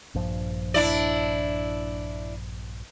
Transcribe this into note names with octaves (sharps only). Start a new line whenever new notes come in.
A#1 G2 F3
D4 E4 D5